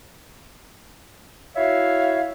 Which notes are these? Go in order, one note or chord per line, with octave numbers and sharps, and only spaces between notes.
E4 F#4 C#5 E5 F5